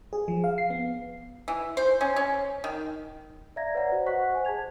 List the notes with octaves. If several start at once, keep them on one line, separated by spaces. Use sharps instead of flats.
G#4
F3
F5
C7
B3
E3
C5
C#4
C#4
D#3
D5 E5 F5 A#5 G#6 A#6
B4 C#5 D5 F#5 A#5
F#4 C5
C5 D#5 F#5 C#6 F#6 B6
C5 G#5
G#4 A5 G#6 F7